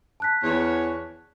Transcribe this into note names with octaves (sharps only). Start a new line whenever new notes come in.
A5 F#6 B6
E2 C#5